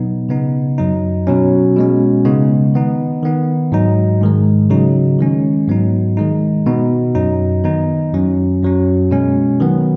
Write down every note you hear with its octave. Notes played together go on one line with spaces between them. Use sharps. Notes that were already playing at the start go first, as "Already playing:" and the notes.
Already playing: B2 F#3 B3 D#4
C#3 B3 D#4
F#2 F#3 D#4
B2 F#3 C#4
B2 G#3 C#4
C#3 G#3 B3 D#4
D#3 B3 D#4
D#3 B3 D#4
G#2 F#3 D#4
G#2 D#3 G#3
C#3 F#3 D#4
D#3 G#3 C#4
G#2 F#3 B3 D#4
D#3 G#3 D#4
B2 B3 D#4
F#2 F#3 D#4
D#3 B3 D#4
F#2 F#3 C#4
F#2 F#3 C#4
B2 G#3 C#4
D#3 F#3 B3